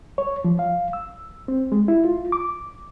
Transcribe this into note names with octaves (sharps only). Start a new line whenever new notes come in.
C#5
F3
F5
E6
C4
G#3
E4
F4
D6